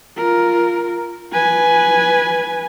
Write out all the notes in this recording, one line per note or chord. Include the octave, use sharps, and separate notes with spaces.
F4 A#4
B4 G#5